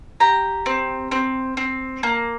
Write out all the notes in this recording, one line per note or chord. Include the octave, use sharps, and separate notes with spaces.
G4 A#5
C4
C4
C4
A#3